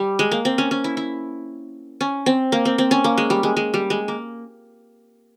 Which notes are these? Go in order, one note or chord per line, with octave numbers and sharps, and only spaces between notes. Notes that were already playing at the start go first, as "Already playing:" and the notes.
Already playing: G3
G#3
A#3
C4
C#4
C#4
E4
E4
C#4
C4
A#3
C4
C4
C#4
A#3
G#3
G3
G#3
G#3
G3
G#3
A#3